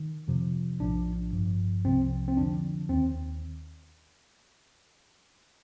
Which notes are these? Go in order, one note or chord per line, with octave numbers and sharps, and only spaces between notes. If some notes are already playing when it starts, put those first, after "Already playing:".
Already playing: D#3
F2 C3 F3
A#1 A2 F3 D4
G1 G2 F3
C2 C3 F3 C4
C4
F2 D3 F3 D4
D#2 D#3 C4